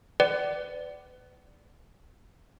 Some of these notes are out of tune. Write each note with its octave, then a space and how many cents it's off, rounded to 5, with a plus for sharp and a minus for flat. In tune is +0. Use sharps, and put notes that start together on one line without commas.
B4 +35 D5 +0 F#5 +40